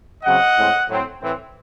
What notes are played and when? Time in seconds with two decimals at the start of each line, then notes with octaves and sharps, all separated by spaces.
0.23 C#3 F#3 C4 D#5 F#5
0.56 A2 G#3 C4
0.88 A2 F#3 C4
1.20 A2 E3 C4